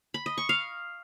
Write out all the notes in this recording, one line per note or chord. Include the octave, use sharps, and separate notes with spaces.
B5
D#5
C#6
F5